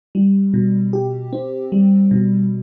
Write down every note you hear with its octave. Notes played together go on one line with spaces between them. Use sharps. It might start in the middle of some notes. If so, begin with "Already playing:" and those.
G3
B2
G4
C4
G3
B2